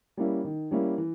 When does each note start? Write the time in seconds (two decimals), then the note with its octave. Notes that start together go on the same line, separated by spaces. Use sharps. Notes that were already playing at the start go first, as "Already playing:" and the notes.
0.17 G3 A#3 C#4 E4
0.44 D#3
0.71 G3 A#3 C#4 E4
0.98 E3